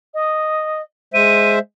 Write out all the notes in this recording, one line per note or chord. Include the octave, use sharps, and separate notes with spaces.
D#5
G#3 C5 E5 D#7